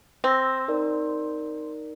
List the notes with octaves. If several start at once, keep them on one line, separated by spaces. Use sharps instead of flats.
C4 E6 A#6
D#4 A#4 D5